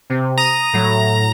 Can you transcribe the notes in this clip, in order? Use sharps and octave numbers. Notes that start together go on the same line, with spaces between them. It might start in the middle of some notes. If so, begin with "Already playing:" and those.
C3
A#5 D#6
A2 F#3